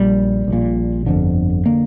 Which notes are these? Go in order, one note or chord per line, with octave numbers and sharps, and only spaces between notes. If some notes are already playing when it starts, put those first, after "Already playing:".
Already playing: A#1 A#2 G3
A#1 A#2
G1 F2 D3
D3 A#3